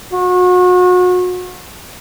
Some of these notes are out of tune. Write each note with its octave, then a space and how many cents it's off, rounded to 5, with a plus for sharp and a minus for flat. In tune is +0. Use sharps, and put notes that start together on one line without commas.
F#4 -35